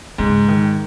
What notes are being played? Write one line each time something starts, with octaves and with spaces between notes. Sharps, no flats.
G#2 C#3
D#3